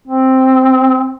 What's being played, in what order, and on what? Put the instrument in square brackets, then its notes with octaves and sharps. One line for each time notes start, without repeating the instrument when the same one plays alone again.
[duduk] C4